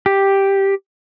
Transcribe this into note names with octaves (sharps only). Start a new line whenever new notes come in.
G4